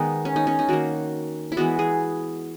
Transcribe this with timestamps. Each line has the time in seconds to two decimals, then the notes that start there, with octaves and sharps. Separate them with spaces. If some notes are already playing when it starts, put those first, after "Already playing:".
Already playing: D#3 G#3 B3 D#4
0.25 C#4
0.36 D#4
0.47 C#4
0.59 D#4
0.69 D#3 A#3 F#4
1.52 E4
1.57 E3 G#3 B3 F#4
1.79 G#4